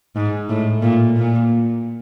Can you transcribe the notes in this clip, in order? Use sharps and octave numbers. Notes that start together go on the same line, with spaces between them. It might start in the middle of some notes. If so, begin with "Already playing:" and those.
G#2
A2
A#2
A#2